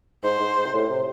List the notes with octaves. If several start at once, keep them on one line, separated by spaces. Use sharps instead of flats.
G#2 C5
G#2
G#2
C3
A2
C3